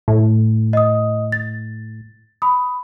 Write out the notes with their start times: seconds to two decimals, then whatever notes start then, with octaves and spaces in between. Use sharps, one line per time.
0.08 A2
0.73 D#5 D#6
1.32 A6
2.42 B5 D#6